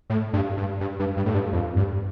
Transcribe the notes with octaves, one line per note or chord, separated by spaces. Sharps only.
A2
G2
G2
G2
G2
G2
A2
G2
F2
G2